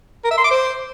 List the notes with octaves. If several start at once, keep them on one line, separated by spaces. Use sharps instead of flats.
A#4
E5
C6
D6
C5